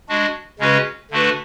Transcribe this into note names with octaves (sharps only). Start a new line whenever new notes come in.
G#3 D4 F#4
C#3 G#3 C#4 F#4 B4
D3 A3 D4 F#4 B4